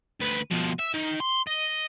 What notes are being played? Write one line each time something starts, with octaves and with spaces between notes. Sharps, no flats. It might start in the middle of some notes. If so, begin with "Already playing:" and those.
D2 B4
B2 F3
E5
D#3
C6
D#5